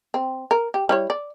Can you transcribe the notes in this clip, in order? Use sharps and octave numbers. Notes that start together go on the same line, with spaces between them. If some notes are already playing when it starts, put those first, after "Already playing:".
C4
A#4
G4
G3 E4 C#5
D5